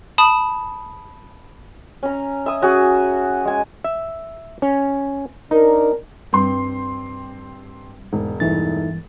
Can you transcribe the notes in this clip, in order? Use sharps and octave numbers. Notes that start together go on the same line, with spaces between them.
A5 B5 D#6
C#4 A#5
E5 G#5 D#6
C#4 F#4 G#4
G#3 G#5
E5
C#4
D4 D#4 A#4
G2 C4 C6
E1 G#2
G2 E3 A3 D#4 E4 A6